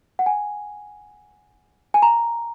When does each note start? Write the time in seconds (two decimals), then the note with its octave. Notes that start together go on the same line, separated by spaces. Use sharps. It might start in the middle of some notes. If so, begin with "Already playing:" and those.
0.19 F#5
0.26 G#5
1.94 G#5
2.02 A#5